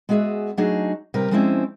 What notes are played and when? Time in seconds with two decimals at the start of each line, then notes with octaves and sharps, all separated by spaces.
0.09 G#3 B3 F#4 G#4 D5 E5
0.57 F#3 A3 D4 D#4 F#4 G#4
1.14 C3 G3 A#4 B4
1.31 F3 G#3 C4 C#4 E4 D5